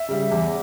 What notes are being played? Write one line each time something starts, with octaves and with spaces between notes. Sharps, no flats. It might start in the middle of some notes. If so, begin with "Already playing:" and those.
Already playing: E5
C#3 G3
E2